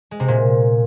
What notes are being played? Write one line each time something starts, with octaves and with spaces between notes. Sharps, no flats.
G#3
C3
A#2